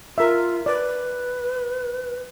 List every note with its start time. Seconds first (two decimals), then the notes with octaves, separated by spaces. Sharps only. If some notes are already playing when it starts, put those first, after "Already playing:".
0.18 F4 A#4 E5
0.66 B4 D5